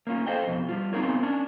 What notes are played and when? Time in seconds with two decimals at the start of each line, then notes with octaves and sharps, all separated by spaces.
0.07 A#3 C#4 F4
0.27 A4 C5 D#5 F5 G5
0.47 F2 B2
0.69 G3 F4
0.93 B3 C4 D#4 F4 A#4 C#5
1.23 C#4 D4